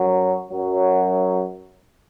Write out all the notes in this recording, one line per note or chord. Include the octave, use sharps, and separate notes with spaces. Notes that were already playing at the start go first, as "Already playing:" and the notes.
Already playing: F#2 F#3
F#2 F#3